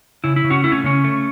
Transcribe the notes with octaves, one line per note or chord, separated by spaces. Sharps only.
C#3 E4
E4
C#3
C#4 F#4
A3 E4
C#4
C#3 C#4
A3